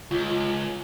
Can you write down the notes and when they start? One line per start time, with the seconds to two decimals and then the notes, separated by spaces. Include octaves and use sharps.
0.11 C#2 F4